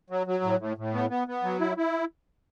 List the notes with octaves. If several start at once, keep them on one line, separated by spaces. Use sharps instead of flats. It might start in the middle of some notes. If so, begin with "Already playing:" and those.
F#3
F#3
A2
A2
A2
B3
B3
B3
F#3
E4
E4